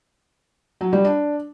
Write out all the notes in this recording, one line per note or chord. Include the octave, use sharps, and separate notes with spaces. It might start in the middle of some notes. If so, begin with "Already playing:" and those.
F#3
G3
D4